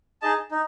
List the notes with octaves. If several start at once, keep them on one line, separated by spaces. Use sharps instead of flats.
D#4 G#4 D#5 A5
D#4